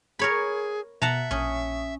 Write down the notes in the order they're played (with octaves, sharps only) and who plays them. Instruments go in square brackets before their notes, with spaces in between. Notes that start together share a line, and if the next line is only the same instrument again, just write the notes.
[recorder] G#4 [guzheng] A#4 C#5 B5
[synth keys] B2 [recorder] E5 [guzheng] F#5 A5 A#5
[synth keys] A#1 C#6 D#6 [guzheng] C#4